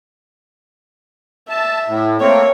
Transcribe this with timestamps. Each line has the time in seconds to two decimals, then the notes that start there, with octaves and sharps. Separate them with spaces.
1.49 E5 A5
1.88 A2
2.21 A3 A#3 C4 C#5